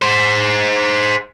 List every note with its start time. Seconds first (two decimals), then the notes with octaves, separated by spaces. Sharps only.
0.02 G#4 C5